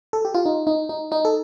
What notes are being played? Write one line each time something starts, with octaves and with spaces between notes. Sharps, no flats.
A4
G4
F4
D#4
D#4
D#4
D#4
A4